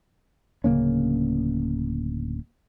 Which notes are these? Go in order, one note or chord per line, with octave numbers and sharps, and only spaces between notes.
D1 C#3 A#3 C#4